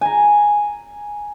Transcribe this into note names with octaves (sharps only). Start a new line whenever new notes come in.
G#5 A#5